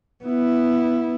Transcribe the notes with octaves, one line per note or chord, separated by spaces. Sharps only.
B3 E4